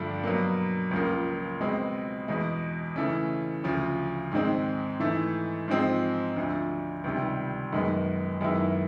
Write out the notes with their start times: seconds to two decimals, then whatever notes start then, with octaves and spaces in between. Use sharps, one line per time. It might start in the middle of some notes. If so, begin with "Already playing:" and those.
Already playing: G2 D3 F3 A3 D4
0.24 B2 F#3 A#3
0.91 C#2 C#3 F3 A#3
1.60 B2 G#3 C4
2.28 E2 B2 G#3
2.96 C#3 E3 A3 C#4
3.64 D2 C#3 F3
4.32 G#2 D#3 G#3 C4
5.00 G#2 E3 A3
5.68 G#2 F3 G#3 C4
6.36 D2 D3 F3
7.04 C#2 C3 D#3 G3
7.73 F#2 D#3 G#3 B3
8.41 F#2 D#3 G#3 B3 E4